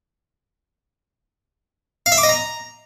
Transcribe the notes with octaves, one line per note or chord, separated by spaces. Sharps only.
F5
E5
D6
D#5
A#5